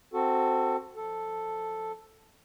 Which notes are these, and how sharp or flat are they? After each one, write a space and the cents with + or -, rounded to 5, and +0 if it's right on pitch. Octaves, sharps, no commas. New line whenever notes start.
C4 +0 F#4 +0 A4 +15
F3 +0 A4 +0